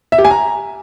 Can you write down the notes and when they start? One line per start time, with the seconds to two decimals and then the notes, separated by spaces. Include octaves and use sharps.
0.12 E5
0.18 G4
0.25 G#5
0.31 A#5